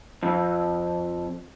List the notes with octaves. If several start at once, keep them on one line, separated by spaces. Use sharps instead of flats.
F2